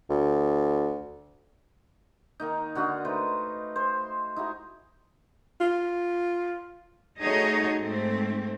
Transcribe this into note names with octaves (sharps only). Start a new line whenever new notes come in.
D2
D#3 A#3 D#4
D3 F#4 D#5 F5
A3 D#4 B4 C5
C5
D#4 E4 F#4 G#4
F4
A3 D#4 F#4 G#4 C#5 D#5
G#2 A3 C4